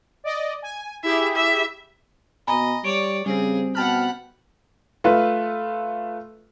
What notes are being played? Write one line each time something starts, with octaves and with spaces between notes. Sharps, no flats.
D5 D#5
G#5
E4 G4 G#4 E5
E5
B2 D#5 G#5 A#5 B5
G3 C#5 D5 D7
C#3 G3 C4 G#4
B2 F#5 G5 A5 B5 F6
A3 F4 B4